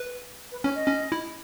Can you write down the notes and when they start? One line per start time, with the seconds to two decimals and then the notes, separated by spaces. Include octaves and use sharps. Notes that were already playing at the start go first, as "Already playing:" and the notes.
Already playing: B4
0.52 B4
0.64 C#4 C#5
0.75 D#5
0.88 C#4
1.12 E4